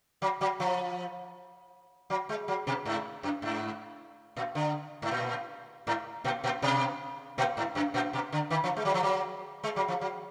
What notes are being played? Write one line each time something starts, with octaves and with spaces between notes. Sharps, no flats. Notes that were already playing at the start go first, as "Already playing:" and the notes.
F#3
F#3
F3
F#3
G#3
F#3
B2
G#2
F#2
G#2
A#2
D3
G#2
A#2
G#2
A#2
A#2
B2
A#2
G#2
F#2
A#2
B2
D3
D#3
F3
G#3
F#3
F3
F#3
G#3
F#3
F3
F#3